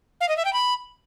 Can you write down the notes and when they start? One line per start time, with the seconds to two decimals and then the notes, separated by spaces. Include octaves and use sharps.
0.21 F5
0.29 D#5
0.37 E5
0.45 G5
0.53 B5